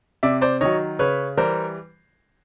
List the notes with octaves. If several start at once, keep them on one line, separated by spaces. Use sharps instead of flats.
C3 D5 E5
C5 D5
D#3 F#3 C#5 D#5
C#3 B4 C#5
E3 G3 A#4 C5